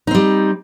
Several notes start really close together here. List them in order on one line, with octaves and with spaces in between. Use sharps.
D#4 C4 G3